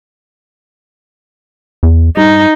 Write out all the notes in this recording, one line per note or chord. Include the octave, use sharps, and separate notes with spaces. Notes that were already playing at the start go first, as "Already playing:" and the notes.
E2
G2 D#4